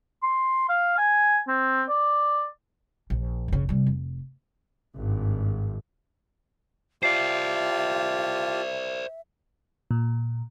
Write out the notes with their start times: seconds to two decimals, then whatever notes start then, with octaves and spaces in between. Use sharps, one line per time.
0.23 C6
0.69 F5
0.98 G#5
1.48 C4
1.89 D5
3.10 A#1
3.48 F#1 C#3
3.69 C3 G3
3.86 F1
4.95 G#1 G2
7.03 F4 G4 C5 D5 E5 A5 C7
9.91 A#2